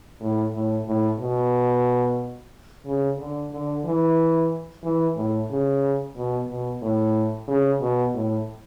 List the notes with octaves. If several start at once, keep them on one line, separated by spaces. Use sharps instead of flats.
A2
A2
A2
B2
C#3
D3
D3
E3
E3
A2
C#3
B2
B2
A2
C#3
B2
A2